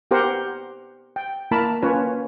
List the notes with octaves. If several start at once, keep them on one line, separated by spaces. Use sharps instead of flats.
B3 G4 A#4 C5 F#5
G5
A#3 E4 A#4 A5 B5
A#3 C#4 F4 B4 C#5